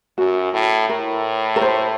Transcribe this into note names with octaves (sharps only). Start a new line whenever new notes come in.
F#2 F#4
A2
A2 A#4
A#4
C5